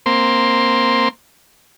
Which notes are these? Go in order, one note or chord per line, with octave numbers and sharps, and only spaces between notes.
A#3 C4 C6